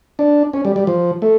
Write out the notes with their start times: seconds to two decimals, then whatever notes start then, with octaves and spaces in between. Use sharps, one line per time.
0.19 D4
0.53 C#4
0.65 G3
0.76 G3
0.87 F3
1.22 A3